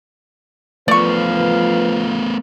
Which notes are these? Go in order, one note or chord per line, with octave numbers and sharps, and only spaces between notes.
F3 A3 B3 B4 D5 F5 C#6